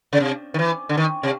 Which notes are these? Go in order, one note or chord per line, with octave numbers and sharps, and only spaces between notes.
C#3
C3
D#3
E3
D3
D#3
C3